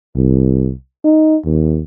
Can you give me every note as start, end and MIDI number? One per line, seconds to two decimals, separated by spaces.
0.16 0.72 36
1.04 1.37 63
1.45 1.82 39